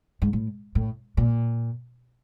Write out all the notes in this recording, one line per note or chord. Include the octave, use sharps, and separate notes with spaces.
G#2
A2
A2
A#2